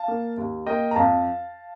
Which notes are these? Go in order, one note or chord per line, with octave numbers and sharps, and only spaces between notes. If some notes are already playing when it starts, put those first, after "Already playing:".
Already playing: F5 A5
A#3
D#2
A#3 D#5 G5
A#5
F2 F5 A5